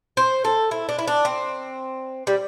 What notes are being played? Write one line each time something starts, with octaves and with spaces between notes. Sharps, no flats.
C5
A4
E4
D4
E4
D4
C4
G3